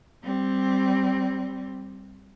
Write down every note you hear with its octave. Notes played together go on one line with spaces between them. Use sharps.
G3 C4